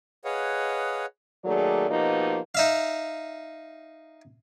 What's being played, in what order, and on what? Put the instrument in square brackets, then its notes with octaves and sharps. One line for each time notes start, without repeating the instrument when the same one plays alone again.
[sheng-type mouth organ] G#4 B4 C#5 D#5 F5 F#5
[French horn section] D#3 F#3 A3 A#3 G#4 D5
B2 F3 A#3 D#4 G4 B4
[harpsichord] D#4 E5 F5